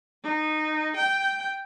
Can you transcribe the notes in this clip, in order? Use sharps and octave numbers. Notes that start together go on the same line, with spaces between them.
D#4
G5